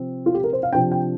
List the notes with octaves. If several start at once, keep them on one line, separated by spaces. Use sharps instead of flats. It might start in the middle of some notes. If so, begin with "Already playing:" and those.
Already playing: C3 F3 C4
F4
G4
A#4
C5
F5
C3 F3 D4 G5
G5